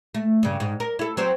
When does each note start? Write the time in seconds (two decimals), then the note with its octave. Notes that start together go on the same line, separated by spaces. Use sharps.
0.14 A3
0.43 G2 C#3
0.60 G#2
0.80 A#4
0.99 E4 A4
1.17 F#3 C4 C5